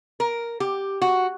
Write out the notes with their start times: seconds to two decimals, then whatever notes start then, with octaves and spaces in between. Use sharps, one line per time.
0.20 A#4
0.60 G4
1.02 F#4